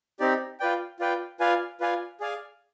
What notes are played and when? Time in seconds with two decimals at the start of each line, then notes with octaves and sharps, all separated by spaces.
0.20 C4 D#4 G4 D5
0.60 F4 B4 D5 G5
1.00 F4 B4 D5 G5
1.40 F4 B4 D5 F5 G#5
1.80 F4 B4 D5 F5 G#5
2.20 G#4 D5 F5 G#5